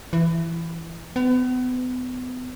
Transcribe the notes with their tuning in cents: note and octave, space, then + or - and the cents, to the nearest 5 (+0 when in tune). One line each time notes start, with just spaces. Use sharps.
E3 +15
B3 +35